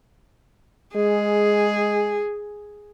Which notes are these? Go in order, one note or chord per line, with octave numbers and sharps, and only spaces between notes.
G#3 G#4